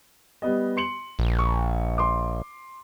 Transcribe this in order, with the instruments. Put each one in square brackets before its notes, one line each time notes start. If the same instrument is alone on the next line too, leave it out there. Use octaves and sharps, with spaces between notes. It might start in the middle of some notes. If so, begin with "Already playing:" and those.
[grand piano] G3 B3 D#5
C6 C#7 F#7
[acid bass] A#1
[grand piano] C#6
C6 D6